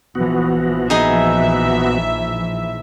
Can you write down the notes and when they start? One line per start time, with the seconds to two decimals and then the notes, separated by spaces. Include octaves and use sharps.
0.15 A#1 E3 F3 B3 F#4
0.90 D#4 G#4 D#5 E5